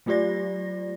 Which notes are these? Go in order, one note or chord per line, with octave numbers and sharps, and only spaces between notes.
F#3 A3 F4 G4 D5 A#6